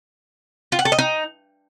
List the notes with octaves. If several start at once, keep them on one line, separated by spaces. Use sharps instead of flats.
F4
F#5
A4
D#5
D#4